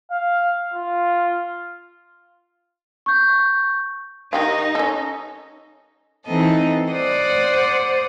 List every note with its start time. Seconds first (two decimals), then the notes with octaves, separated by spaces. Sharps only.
0.11 F5
0.74 F4
3.06 C#6 G6
4.33 D#3 D#4 G4 F5
4.75 C#4 A4
6.27 E3 C4 D#4 A4 D#5
6.91 C5 D5 F#5 D#6